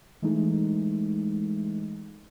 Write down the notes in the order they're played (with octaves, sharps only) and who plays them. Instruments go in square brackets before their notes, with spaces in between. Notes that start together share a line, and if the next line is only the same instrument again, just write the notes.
[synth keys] E3 G#3 A3 D#4